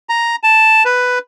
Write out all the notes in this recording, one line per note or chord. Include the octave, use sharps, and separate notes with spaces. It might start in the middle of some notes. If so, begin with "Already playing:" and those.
A#5
A5
B4